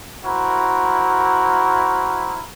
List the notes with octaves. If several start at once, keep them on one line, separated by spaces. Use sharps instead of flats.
E4 F#4 A#4 C5